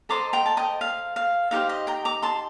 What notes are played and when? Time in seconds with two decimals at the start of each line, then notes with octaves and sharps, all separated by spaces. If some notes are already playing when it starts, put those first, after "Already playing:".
0.09 A4 C5 D#5 A#5 D6
0.33 G5 A#5
0.46 A5
0.57 D#5 G5
0.81 F5
1.16 F5
1.51 D#4 G4 C5 F5
1.69 D#5
1.87 G5 A#5
2.05 A#5 D6
2.22 A5 C6